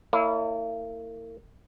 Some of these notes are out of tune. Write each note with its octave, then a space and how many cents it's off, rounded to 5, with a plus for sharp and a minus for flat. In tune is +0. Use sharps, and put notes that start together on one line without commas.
A#3 -40 E4 -15 C#5 +40